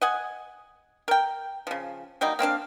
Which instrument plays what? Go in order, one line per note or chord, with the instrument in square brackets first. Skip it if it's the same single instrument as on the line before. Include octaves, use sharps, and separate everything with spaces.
[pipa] D#5 F#5 G#5
A#4 G5
C#3 F3
F#3 G3 A#3 D#4
A#3 C4 D4 F5